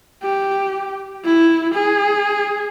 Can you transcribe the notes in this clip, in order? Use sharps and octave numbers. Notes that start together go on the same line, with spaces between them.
G4
E4
G#4